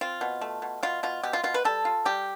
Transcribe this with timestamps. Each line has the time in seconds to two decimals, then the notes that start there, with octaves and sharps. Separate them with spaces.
0.01 C4 F4
0.21 B2
0.41 A3
0.62 B2
0.83 B2 F4
1.03 B2 F4
1.23 B2 G4
1.33 F4
1.43 B2 F4
1.54 B4
1.65 G3 A4
1.85 F4
2.05 G3 G4